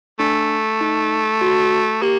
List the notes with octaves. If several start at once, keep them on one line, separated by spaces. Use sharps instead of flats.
A3 D4
D#4
F#4
A#3 G4